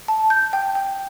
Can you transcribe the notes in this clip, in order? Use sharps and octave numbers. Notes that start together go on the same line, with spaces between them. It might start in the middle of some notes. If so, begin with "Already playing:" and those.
A5
G6
G5
G5